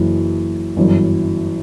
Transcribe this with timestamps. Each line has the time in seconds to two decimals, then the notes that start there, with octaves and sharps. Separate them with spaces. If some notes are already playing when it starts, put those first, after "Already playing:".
Already playing: F#1 F#2 E3
0.76 G1 F#2 E3